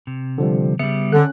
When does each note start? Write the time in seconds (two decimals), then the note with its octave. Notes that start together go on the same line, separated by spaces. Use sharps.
0.07 C3
0.38 D3 F3 G3
0.79 C#3 G3 B3 E5 C#7
1.13 D3 C#4 F#6